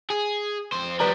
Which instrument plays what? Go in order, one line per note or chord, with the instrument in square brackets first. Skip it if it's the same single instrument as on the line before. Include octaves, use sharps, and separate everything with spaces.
[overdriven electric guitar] G#4
F2 C5
[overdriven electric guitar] F3 G3 [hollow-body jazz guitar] B4 D5 A#5